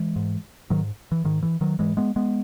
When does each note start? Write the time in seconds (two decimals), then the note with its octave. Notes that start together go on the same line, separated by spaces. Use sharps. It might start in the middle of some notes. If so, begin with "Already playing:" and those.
Already playing: E3 G#3
0.16 G#2
0.70 G#2 D#3 F#3
1.12 E3
1.25 G#2 D#3
1.43 E3
1.61 D#3 F#3
1.79 G#2 E3 G#3
1.97 G#3 B3
2.16 G#3 B3